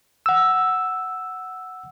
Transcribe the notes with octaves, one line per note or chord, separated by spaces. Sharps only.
F#5 E6